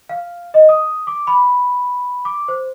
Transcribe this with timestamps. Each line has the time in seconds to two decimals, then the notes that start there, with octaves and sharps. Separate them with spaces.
0.09 F5
0.54 D#5
0.69 D#6
1.07 D6
1.27 B5
2.25 D6
2.48 C5